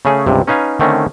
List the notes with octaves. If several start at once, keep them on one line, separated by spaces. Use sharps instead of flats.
C#3 A3 C#4 G#4
C#2 G2 C3
C#4 D#4 B4 F5 G#5
D3 D#3 A3 C4 C#4